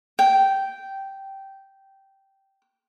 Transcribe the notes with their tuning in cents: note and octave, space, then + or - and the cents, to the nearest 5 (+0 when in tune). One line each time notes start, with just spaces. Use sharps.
G5 -10